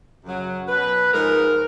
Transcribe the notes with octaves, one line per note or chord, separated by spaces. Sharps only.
F#2 C#3 F#3
B2 F#3 B4
G#2 F3 G#3 A#4